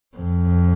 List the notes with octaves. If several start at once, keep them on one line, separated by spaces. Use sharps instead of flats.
F2